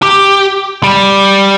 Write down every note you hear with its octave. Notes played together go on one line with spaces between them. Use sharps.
G4
G3